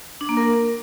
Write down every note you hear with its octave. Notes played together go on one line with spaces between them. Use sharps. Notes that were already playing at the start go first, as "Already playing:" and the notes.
D4
A#3
A#4